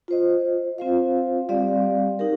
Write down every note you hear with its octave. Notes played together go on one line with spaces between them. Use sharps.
F4 C5 D#5
C4 F4 C5 F5
G3 C4 G4 D5 F5
D#4 G4 A#4